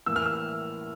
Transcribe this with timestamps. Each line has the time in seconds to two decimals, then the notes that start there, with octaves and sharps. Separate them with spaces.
0.06 A2 E3 A#3 E6
0.16 F6
0.26 E6